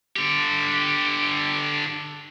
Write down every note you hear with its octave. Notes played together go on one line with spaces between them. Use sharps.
D3 G4